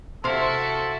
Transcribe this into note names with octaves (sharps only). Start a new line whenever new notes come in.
C3 E4 F#4 A4 F5 C6